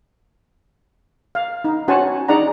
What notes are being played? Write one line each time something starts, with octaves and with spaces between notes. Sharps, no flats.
F5
D#4
C#4 F#4 C5 F#5 G#5 A5
D4 D#4 G#4 D5 F#5 A#5